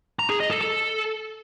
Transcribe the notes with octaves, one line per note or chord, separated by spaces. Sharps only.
A#5
G#4
D#5
A4
A4